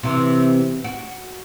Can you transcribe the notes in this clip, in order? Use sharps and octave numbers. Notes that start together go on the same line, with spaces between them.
C3 E3
F#4